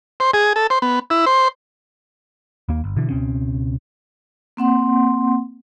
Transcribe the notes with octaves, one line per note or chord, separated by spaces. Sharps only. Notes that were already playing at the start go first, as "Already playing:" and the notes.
C5
G#4
A4
C5
B3
E4
C5
D#2 A#3
G1
B2 D3 E3
C#2 B2 C4 C#4
A#3 C4 F#5 C6